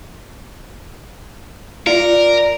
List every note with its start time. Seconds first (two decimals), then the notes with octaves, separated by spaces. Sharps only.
1.87 F4 A#4 D5